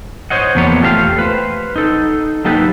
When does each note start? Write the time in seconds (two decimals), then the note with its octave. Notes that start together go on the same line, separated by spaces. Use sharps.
0.30 C5 C#5 D#5 F#5
0.55 E2 F3 A#3 B3 C#5
0.82 A3 F4 G4 A4 E5 F5
1.18 B4 C5
1.76 D#4 A4
2.45 F#3 A#3 D#4 G4 A4 B4